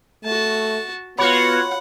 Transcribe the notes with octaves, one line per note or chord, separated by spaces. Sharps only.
A3 F#4 A5
B3 F4 F#4 C#5 F#5 B5